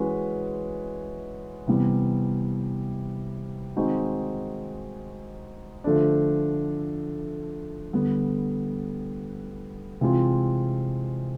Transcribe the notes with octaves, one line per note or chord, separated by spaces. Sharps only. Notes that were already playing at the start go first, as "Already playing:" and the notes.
Already playing: E3 G#3 C#4 F#4 B4
C3 E3 G3 B3
D#3 G#3 C4 D#4 F#4
D3 F3 A3 D4
D3 G3 B3
C3 E3 G#3 C4 F4